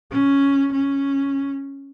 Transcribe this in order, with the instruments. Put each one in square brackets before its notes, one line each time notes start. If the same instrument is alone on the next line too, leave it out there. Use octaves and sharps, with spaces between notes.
[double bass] C#4
C#4